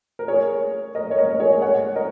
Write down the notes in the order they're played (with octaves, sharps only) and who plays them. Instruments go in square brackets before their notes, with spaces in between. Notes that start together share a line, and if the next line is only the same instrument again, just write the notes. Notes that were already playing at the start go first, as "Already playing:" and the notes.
[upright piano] A#4
G#4 C#5
A#4 D#5
C#5
A#4 D#5
A#4
G#4 C#5
C#5 F#5
A#4 D#5